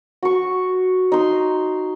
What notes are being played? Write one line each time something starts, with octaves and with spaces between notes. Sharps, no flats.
F#4 C#6
D#4 C6